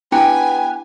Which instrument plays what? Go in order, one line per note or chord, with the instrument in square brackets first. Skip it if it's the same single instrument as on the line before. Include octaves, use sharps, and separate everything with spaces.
[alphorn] B3 [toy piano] D4 E4 G5 [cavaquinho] G4 B4 [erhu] G#5